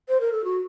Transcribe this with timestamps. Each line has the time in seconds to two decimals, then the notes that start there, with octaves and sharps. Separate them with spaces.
0.09 C5
0.21 A#4
0.32 A4
0.44 F#4